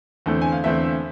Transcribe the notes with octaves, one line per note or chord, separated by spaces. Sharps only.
E2 D3 A3 C4
G#5
F5
E2 D3 A3 C4 E5